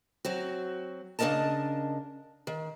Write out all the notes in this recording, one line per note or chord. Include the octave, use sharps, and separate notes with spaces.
F#3 C4 F#4
C#3 D4 A4 A#4 D#5 A5
D#3